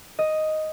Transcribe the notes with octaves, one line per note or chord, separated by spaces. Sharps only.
D#5